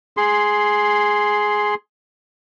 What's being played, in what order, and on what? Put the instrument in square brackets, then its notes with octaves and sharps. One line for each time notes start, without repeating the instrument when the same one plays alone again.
[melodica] G#4 C6